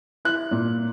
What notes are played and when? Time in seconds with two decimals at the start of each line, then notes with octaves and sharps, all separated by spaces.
0.25 E4 F#6
0.51 A#2